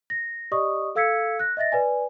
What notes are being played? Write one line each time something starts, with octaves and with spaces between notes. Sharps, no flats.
A#6
G4 D5 D#5 C#6 D#6
A4 F5 E6 G#6 B6 C#7
F#6 A#6
D#5 E5 A6 A#6
B4 D5 G#5